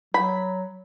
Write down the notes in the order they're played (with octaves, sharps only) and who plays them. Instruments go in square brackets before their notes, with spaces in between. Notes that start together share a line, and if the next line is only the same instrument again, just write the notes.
[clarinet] F#3 [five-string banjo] B5